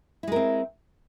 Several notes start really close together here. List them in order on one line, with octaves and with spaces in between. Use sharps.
E4 G#3 A#4 C4